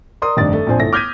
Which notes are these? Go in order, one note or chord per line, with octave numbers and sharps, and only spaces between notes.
A#4 D5 C6 D#6
F1 G2 D#3 D5 A6
A3
A#1 F2 D4 C5 G#5
G1 A3 E4 A#6
D6 F6 G6 G#6 B6 D#7